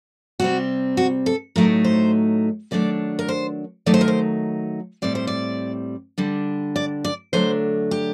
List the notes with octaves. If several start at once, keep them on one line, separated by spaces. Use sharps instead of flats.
C3 G3 C4 F#4
F#4
A4
A2 F#3 A3 D#4 A#4
C5
D#3 F#3 A3 D4 D5
A#4
C5
D#3 F#3 A3 D#4 D5
C5
A#4
C5
A2 G3 C4 D5
C5
D5
D3 G3 D4
D5
D5
D3 F#3 A3 D4 C5
G4